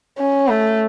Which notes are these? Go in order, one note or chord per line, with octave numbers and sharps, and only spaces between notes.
C#4
A3